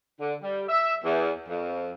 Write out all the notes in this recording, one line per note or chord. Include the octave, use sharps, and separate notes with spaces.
D3
G3
E5
E2
F2